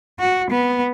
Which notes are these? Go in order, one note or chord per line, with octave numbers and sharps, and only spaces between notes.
F#4
B3